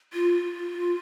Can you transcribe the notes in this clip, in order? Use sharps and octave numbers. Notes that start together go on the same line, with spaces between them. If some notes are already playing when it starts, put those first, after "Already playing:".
F4